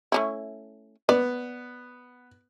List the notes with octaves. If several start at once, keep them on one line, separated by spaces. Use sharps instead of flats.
A3 C#4 E4
B3 D5